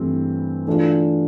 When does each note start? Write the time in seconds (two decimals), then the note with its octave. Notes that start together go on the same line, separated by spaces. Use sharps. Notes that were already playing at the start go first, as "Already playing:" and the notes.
Already playing: G2 E3 A3 C4
0.67 E3 A3 D4 F4